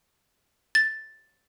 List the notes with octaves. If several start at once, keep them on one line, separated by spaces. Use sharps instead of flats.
A6